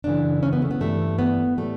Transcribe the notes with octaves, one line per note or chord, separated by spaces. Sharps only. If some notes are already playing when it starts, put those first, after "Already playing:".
F#2 C#3 E3 D4
C#4
B3
A3
B3
G2 E3 G3 A3
B3
A2 G3 A3